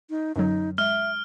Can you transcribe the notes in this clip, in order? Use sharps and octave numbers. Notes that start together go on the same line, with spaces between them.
D#4
F#2 D3 F#3 D#4
G#3 E5 F6